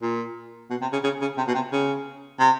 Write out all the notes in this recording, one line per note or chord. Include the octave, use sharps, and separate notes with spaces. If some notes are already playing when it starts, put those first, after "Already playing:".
A#2
B2
C3
C#3
C#3
C#3
C3
B2
C3
C#3
C3